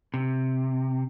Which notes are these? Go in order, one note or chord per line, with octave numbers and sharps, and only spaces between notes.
C3